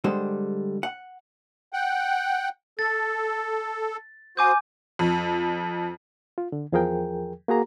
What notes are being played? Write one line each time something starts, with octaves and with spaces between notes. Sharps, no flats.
D3 G3 G#3 C5
F#5
F#5 G5
A4 A6
F#4 C5 G#5 D6 D#6 G6
F2
F4
D3
E2 F3 G#4 A#4 G5
A#3 F#4 G#4 A#5